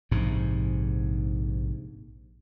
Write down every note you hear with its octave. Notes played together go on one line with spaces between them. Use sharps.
A#1 G#2 C3